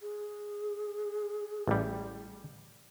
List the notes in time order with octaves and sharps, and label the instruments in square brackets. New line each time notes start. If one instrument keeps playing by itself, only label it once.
[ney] G#4
[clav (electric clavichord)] A1 G3